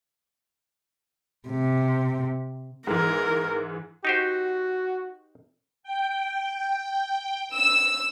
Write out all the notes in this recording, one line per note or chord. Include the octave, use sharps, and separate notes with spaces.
C3
G#2 E3 A#4
D#4 F#4 G4 C5
G5
E6